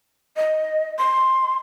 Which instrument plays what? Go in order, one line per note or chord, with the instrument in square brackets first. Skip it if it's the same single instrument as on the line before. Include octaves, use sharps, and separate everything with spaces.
[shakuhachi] D#5
C6